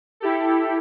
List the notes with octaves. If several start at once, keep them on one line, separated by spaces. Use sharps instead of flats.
E4 G4 A4